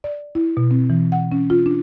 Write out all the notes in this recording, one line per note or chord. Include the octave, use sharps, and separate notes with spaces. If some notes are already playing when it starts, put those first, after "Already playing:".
D5
E4
B2
C4
E3
F#5
C#4
F4
D4